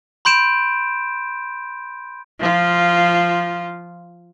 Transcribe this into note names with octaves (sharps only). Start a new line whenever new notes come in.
B5 C6 G6 D7 E7
F3 F4